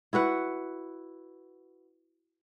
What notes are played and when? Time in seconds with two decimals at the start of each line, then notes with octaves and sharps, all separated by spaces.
0.13 E4 F#4 B4 F#5